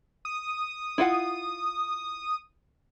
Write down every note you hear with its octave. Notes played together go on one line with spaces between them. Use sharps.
D#6
E4 F4 F#5